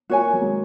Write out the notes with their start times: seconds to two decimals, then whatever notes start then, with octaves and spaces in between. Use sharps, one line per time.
0.10 A#3 F#4 C#5 G#5
0.33 F#3
0.42 G#3